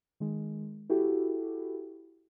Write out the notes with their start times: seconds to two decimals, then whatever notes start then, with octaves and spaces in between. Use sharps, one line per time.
0.20 D#3 G#3
0.90 E4 F#4 G4 A4